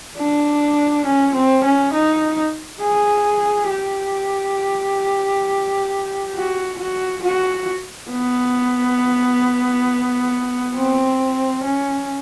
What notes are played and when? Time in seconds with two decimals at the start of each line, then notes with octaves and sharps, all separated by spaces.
0.17 D4
1.05 C#4
1.35 C4
1.64 C#4
1.93 D#4
2.81 G#4
3.70 G4
6.35 F#4
6.79 F#4
7.23 F#4
8.11 B3
10.75 C4
11.63 C#4